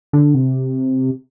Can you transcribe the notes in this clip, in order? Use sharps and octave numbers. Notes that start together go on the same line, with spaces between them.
D3
C3